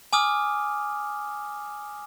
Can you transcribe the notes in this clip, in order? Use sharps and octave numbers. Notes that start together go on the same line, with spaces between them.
G#5 D6 D#6 F6